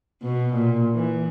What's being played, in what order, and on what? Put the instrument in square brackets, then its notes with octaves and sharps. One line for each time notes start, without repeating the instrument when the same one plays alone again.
[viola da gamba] B2
A#2
E3